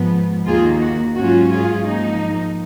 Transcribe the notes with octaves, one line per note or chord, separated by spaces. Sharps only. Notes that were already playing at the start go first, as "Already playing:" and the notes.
Already playing: G#2 F3 B3
D#2 D#3 A#3 F4 G#4
F#4
G#2 F#3 C#4 F4 F#4
F4 G#4
G#2 F3 A#3 D#4